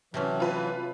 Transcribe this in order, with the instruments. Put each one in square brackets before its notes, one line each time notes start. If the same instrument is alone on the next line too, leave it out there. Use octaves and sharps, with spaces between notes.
[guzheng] C3 A3 C#4 [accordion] E3 F#3
[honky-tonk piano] F4 B4